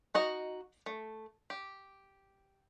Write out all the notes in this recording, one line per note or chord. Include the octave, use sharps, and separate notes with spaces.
D#4 F#4 D#5
A3
G4